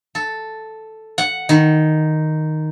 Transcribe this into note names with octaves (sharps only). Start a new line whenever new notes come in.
A4
F#5
D#3